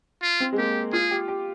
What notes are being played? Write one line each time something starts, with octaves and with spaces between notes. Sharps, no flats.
F4
C4
G#3
A#3 G4
F4 G#4
G4
G4